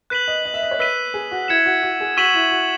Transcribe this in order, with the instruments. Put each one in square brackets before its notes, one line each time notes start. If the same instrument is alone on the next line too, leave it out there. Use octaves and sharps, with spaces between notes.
[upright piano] B4 [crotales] F#6 B6 D#7 F#7
[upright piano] D#5
D#5
E5
D#5
C#5
[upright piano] B4 [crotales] E6 B6 D#7
[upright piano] G#4
F#4
[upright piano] E4 [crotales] G#6 C#7 E7
[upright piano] F#4
F#4
G#4
[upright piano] F#4 [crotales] C#6 E6 B6 D#7 F#7
[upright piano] E4
F#4